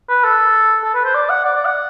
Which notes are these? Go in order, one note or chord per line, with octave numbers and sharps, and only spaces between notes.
B4
A4
A4
B4
C5
D5
F#5
D5
D5
F#5